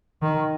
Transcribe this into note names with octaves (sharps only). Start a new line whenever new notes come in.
D#3